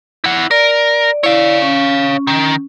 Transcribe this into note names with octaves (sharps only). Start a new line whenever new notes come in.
E4 F#5
A#4 D5
E4 C#5 D5 F5
C#4
D#3